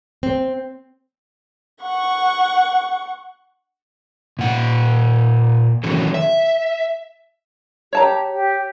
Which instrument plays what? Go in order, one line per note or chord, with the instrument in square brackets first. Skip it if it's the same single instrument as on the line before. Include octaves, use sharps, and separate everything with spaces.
[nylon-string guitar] C4
[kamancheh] F#5 C#6
[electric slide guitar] A#2 F#5
D#3 E3 F#3 C#4 A4
E5
[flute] G4 [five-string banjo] C#5 A5 A#5
[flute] G4